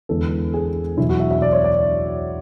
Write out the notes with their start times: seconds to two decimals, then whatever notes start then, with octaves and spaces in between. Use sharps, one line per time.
0.09 E2 D3 G#3 B3 E4 A4
0.54 G#4
0.97 E2 B2 F#3 E4
1.09 F#4
1.20 E5
1.31 E5
1.42 D5
1.53 C#5
1.64 D5